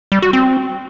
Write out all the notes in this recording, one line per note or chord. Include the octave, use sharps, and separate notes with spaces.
G3
F#4
C4